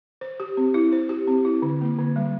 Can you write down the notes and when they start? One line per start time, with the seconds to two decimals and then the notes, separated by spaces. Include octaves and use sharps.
0.21 C5
0.40 G4
0.57 C4
0.74 E4
0.92 C5
1.09 G4
1.27 C4
1.45 E4
1.62 D3
1.81 A#3
1.99 D3
2.16 G3